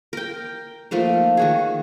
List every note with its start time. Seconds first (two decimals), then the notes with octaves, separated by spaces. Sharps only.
0.13 A#4 G5
0.91 F3 A3 A#3 D#4
1.37 D#3 F#4 G#4